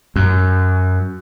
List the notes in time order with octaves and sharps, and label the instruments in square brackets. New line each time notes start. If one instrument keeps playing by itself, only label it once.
[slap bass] F#2